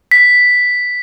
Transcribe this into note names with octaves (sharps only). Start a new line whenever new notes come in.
B6